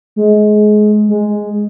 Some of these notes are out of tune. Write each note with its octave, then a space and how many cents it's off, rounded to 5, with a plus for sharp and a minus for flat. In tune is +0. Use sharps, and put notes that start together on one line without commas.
G#3 +25
G#3 +0